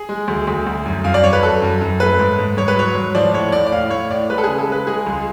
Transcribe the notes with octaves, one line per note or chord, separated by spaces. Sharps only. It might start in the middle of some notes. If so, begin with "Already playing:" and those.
Already playing: G#4
G#3
D2
D2
D2
F#2
F#2 F5
D5
F#2 C#5
B4
F#2 A4
F#2
F#2
A3 B4
G#2
G#2
G#2 C#5
B4
F#3 C#5
G#2
F3 D5
A2 C#5
A2 D5
D5
A2 F5
A2 C#5
A2 D5
G#3 B4
A4
C#3 G#4
A4
G#3 B4
G#3 G#4
C#2